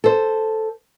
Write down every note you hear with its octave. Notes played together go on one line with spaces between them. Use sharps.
A4 C5